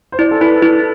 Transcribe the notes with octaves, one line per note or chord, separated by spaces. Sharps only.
C5
E4 D5
A4
E4 B4
E4 A4